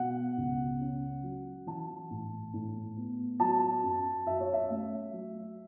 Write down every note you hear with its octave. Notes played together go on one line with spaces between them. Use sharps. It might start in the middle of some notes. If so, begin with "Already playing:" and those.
Already playing: B2 F#5
C#2
C#4
F#3
E3 A5
A2
A2
B3
F#3 A5
F#2
F#2 E5
C#5
E5
A3
F#3